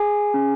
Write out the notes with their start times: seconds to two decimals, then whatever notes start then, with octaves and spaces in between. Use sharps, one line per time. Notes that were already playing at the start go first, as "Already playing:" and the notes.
Already playing: G#4 G#5
0.34 C#4